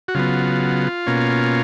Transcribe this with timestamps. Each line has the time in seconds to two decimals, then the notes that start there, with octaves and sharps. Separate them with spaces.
0.08 F#4
0.15 C#3 F#3 B3 F4
1.07 B2 A#3 C#4